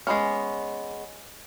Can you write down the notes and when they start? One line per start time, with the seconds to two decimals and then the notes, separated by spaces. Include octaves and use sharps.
0.07 G#3 B3 C#4